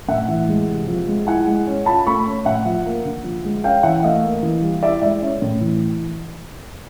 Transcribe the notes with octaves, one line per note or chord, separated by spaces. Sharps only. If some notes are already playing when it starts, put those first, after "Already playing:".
A2 E5 F#5
E3
G#3
C3
F3
G#3
E4 F#5 G#5
G#3
C#4
F4 A5 B5
A3 B5 C#6
C#4
A2 E5 F#5
F3
A#3
D3
F3
G#3
C#4 F5 G5
E3 E5 F#5
A3 D#5 F5
A#3
E3
G3
E4 D5 E5
G#3 D5 E5
C#4
A2
E3